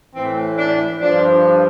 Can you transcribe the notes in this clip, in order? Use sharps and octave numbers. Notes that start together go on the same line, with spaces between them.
A2 E3 C4
D4
G2 F3 D4